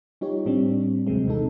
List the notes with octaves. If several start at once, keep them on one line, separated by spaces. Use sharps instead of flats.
G3 D#4 F4 G4 C#5
A2 G3 C4 D4
D#2 C3 F#3 G#3 C4
A#1 C3 E3 D#4 A4